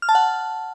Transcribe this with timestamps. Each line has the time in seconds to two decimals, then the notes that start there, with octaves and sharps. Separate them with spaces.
0.02 F6
0.09 A5
0.15 F#5